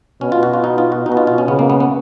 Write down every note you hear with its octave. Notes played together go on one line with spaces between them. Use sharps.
B2 C#4
F4
F#4
F4
D#4
F4
F#4
B2 D#4
F#4
F4
F4
C#4
C#3 B3
A#3
B3
B3